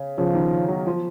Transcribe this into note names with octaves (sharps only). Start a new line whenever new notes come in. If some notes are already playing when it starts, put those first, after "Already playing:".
Already playing: C#3
C#3 F3
D#3
F#3
F3